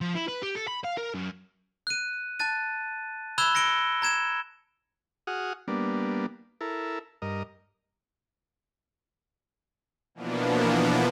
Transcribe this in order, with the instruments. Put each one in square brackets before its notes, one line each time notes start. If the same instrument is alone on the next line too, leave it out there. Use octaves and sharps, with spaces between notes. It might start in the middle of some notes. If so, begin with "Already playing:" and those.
[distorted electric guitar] F3
E4
B4
G4
A4
B5
F5
A#4
F#2
[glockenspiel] F#6 D#7
A5 F#6 A6 D#7
B5 E6 F#6 G#6 E7 G7
A#6 C#7 D7 G7
A#5 G#6 E7
[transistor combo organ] F#4 G#4 F#5 D#6 F6
G3 A#3 B3 D4
E4 A4 A#4
G2 A#4 D#5
[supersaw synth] B2 E3 F3 A#3 B3 D4